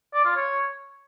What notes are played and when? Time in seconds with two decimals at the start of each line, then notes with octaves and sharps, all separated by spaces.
0.14 D5
0.25 F4
0.36 C#5